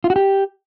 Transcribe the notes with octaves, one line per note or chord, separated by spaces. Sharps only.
F4
F#4
G4